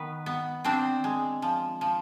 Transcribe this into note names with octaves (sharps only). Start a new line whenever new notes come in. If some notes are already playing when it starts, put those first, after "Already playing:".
Already playing: D#3 B3 B4
B3
C4 D4 C5
G#3
F3
F3